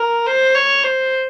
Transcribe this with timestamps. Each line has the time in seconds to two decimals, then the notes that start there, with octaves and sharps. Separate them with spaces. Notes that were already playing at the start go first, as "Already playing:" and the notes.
Already playing: A#4
0.26 C5
0.55 C#5
0.83 C5